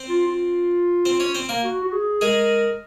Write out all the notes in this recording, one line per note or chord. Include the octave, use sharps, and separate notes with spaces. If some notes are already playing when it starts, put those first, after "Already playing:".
Already playing: C4 C5
F4
F4
C4 C5
C#4 C#5
C4 C5
A#3 A#4
F#4
F#4
G#4
G#3 G#4 A#4